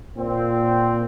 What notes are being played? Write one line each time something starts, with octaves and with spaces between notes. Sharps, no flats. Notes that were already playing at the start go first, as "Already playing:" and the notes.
A#2 C4